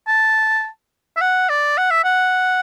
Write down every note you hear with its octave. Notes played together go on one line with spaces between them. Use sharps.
A5
E5
F#5
D5
F#5
E5
F#5